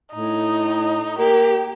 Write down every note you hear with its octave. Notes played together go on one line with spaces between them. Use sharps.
A2 D#4
A#3 G4